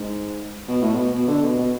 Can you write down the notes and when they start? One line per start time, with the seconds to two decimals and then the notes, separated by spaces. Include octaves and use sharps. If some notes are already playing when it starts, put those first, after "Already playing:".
Already playing: G#2
0.68 B2
0.82 A2
0.95 B2
1.13 B2
1.28 D3
1.43 B2
1.59 B2